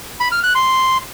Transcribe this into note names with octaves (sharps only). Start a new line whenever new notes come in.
B5
F6
F#6
C6